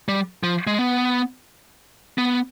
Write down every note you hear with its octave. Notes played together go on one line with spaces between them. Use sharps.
G3
F3
G#3
B3
B3